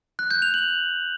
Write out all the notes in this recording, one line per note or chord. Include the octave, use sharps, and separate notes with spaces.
F#6
G6
F7
F#7